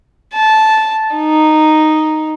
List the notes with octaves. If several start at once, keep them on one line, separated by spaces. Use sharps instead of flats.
A5
D#4